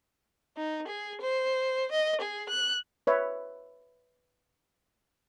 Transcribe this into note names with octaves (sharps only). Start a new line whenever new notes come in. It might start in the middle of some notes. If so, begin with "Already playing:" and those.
D#4
G#4
C5
D#5
G#4
F#6
B4 C#5 E5